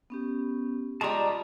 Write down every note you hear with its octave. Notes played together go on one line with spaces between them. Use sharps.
B3 C#4 G4
G3 G#3 F4 A5 A#5 C#6